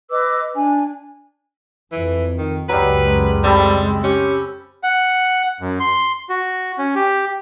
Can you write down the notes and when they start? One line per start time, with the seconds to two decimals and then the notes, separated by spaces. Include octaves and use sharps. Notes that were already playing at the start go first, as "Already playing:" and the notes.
0.11 B4 D#5 D6 E6
0.56 D4 G#5
1.92 F2 E3
2.37 D#3
2.69 C#2 F#2 F#3 G3 B4
3.03 G#3
3.44 G3 C4 A4 B5
4.04 C#4 G4
4.83 F#5
5.60 F#2
5.80 C6
6.30 F#4
6.79 C#4
6.95 G4